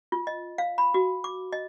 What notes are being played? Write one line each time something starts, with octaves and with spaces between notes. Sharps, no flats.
F4
D#5
F5
B5
F#4
D6
D#5